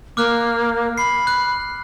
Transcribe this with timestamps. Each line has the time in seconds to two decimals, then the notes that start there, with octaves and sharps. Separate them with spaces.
0.17 A#3 D6 F6 F#6
0.98 B5 C7
1.27 F#6